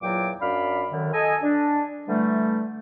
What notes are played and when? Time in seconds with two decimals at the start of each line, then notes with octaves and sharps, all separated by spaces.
0.02 E2 A#2 F#3 F4 G5 D6
0.41 F#2 D4 F5 B5
0.91 F#2 D3 D#3
1.13 A4 D#5 G#5
1.42 D4
2.07 D3 E3 G3 A3